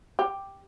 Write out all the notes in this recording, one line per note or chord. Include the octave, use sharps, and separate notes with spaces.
G4